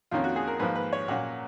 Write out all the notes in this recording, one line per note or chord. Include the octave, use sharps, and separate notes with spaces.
F2 D#3 A#3 C#4 F4
F#4
G#4
A#4
G#2 F3 A#3 B4
B4
C#5
A#2 F#3 A#3 C#4 F#5